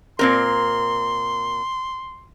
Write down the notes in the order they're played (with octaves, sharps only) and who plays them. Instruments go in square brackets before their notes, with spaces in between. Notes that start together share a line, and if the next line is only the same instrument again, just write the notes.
[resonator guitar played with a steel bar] A#2 C4 A#4 [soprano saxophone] C6